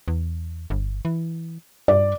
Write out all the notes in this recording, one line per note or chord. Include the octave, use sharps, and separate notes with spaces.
E2
G1
E3
G2 D5